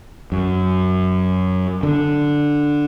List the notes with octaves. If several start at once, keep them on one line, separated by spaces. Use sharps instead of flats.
F#2
D3